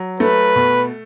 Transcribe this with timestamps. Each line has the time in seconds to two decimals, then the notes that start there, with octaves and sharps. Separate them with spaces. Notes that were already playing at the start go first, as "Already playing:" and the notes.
Already playing: F#3
0.20 A3 B4
0.56 B2